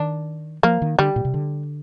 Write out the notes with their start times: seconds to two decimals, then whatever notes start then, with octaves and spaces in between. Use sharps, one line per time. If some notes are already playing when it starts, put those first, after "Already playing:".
Already playing: D#3 D4
0.63 F3 A#3
0.82 D#3
0.99 D3 G3
1.16 A#2
1.25 C3
1.34 D3